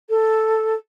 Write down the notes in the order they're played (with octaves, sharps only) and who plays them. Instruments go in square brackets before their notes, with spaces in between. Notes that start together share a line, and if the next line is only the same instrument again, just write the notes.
[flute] A4